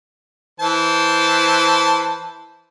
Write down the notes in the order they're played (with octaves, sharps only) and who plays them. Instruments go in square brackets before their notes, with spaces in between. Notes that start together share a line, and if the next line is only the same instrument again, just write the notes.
[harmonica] E3 C5 A5